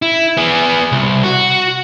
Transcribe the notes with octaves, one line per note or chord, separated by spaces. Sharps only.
E4
B3 G#4
C2
F#4